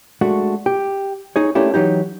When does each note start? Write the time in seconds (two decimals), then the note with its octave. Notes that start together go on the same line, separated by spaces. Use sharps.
0.21 G#3 A3 D4 F#4
0.66 G4
1.36 D#4 G#4 C#5
1.55 A3 A#3 C#4 D4 E4 G4
1.74 E3 F#3 D#4 G4